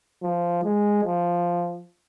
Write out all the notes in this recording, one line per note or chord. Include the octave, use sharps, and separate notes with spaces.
F3
G#3
F3